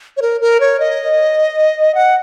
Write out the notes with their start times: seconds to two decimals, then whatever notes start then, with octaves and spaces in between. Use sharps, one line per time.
0.17 C#5
0.22 A#4
0.41 A#4
0.60 C#5
0.80 D#5
1.95 F#5